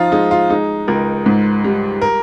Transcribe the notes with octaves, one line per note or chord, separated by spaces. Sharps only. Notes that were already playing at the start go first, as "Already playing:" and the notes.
Already playing: F3 D#4 F4
G#3 D#4
F4
G#3 D#4
C#2 A#4
G#2
G3
A#4